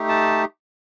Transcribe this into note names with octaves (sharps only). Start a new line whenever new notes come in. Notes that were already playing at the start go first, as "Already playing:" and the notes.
Already playing: A3 D#4 G4
A5